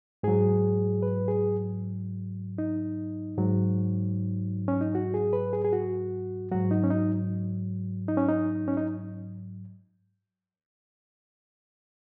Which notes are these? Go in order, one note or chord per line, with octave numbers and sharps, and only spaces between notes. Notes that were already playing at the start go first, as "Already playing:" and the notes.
G#2 F#3 G#4
B4
G#4
D#4
G#2 F#3
C#4
D#4
F#4
G#4
B4
G#4
G#4
F#4
G#2 F#3 F#4
D#4
C#4
D#4
D#4
C#4
D#4
C#4
D#4